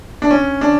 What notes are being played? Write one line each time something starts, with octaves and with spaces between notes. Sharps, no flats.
D4
C#4
D4